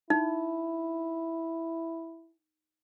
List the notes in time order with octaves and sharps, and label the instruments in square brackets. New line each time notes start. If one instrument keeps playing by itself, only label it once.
[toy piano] D#4 [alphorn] E4